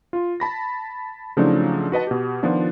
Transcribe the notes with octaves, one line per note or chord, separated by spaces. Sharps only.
F4
A5 B5 A#6
C#3 F3 F#3 A3 D4 D#4
F#4 B4 D#5 A5
B2 G4
D#3 F3 B3 D4 F4